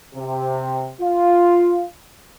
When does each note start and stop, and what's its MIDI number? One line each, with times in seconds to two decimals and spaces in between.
0.15 0.91 48
1.00 1.84 65